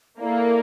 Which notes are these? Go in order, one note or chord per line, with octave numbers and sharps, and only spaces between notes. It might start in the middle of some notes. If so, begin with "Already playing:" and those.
A#3 E4 A4 D5 F5